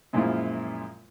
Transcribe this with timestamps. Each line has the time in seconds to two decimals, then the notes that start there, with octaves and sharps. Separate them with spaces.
0.13 F#2 A#2 F3 G#3 E4 F4